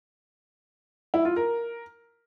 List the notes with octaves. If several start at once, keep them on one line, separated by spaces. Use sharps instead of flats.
E4
F4
A#4